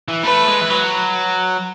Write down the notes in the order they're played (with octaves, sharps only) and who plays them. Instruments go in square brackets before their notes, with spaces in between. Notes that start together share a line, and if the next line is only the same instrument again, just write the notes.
[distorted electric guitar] E3
[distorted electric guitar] A3 [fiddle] B4
[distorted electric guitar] G#3
E3
F#3